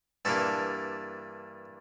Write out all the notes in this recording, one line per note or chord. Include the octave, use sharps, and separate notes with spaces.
G2 E3 A#3 D4 A4